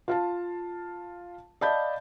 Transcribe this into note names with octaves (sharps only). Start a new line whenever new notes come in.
F4 F5 A5
D5 D#5 F5 A5 B5 G6